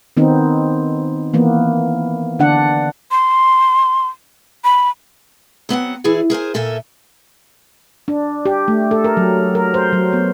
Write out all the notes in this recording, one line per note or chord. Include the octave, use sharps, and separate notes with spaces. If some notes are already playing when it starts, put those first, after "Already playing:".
D#3 B3 C4 D#4
E3 A#3 B3
D3 D4 F#5
C6
B5
F#3 B3 C4 F#5
E3 E4 G#4 D5
G#4 A#4 C5 G#5
A#2 A4 A#4 E5 G#5
D4
G4
A3
A4
A#4
F#3
A#4
C5
F#3
B3